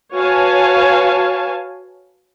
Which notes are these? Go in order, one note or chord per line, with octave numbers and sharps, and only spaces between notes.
F#4 B4 C#5 F5 G#5 A5